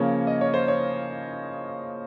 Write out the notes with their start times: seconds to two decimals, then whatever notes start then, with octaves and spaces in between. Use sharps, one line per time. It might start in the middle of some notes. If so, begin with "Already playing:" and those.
Already playing: C#3 F3 A#3 C#4 C#5
0.27 D#5
0.41 C#5
0.54 C5
0.68 C#5